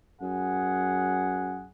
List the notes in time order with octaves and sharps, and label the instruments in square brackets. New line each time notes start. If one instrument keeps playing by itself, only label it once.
[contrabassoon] F#2 [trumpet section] G#4 F#5